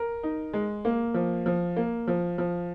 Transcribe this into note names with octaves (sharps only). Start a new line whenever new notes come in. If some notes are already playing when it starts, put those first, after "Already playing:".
Already playing: A#4
D#4
G#3
A#3
F3
F3
A#3
F3
F3